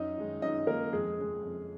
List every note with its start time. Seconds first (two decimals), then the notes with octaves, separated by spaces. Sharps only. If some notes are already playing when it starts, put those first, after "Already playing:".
Already playing: F#2 D#4 D#5
0.18 D#3 G#3
0.42 F#2 D#4 D#5
0.67 D#3 G#3 A#3 A#4
0.92 F2 G#3 G#4
1.17 C#3 G#3
1.43 F2